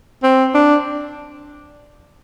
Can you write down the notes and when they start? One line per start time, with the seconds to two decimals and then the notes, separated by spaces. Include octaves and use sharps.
0.23 C4
0.54 D4